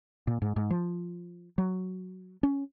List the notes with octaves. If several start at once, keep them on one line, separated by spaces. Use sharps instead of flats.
A#2
G#2
G#2
F3
F#3
C#4